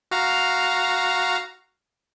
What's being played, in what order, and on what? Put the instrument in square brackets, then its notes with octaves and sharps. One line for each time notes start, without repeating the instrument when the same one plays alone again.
[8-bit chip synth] F#4 F5 A#5